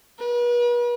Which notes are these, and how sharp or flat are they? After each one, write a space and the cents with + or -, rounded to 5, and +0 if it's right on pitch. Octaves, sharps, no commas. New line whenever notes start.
B4 -40